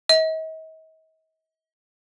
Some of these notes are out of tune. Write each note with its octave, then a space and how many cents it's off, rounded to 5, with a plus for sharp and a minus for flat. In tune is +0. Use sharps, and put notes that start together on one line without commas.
D#5 +45